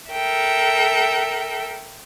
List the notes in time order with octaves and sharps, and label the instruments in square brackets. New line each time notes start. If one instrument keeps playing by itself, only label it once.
[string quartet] A4 A#4 E5 G5